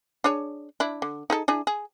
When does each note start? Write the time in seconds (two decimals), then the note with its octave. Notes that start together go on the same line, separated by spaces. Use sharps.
0.24 D4 G#4 C#5
0.80 D4 E4
1.02 D3
1.30 D#4 G#4 A4
1.48 D4 E4 G#4
1.67 G#4